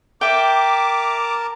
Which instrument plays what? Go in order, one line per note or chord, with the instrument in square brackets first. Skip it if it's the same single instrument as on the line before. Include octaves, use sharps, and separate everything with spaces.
[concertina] A#4 A5 A#5 [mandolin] E5 G5 [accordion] D6